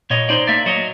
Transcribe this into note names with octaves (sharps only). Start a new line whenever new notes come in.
A#2 C#5 D#5
D#4 C5 D5
A#3 D5 E5
F#3 C#5 D#5